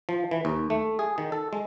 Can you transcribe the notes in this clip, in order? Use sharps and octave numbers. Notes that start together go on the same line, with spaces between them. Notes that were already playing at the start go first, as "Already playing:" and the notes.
F3
E3
D#2
A3
G#4
D#3
A4
G#3